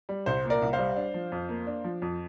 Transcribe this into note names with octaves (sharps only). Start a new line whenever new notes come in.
G3
C2 C5
A#2
A#4 D5
C2
C5 F5
G3
D4
F3
F2
A#3
D4
F3
F2